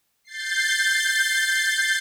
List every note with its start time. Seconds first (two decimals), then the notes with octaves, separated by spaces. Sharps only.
0.24 G6 A6 C7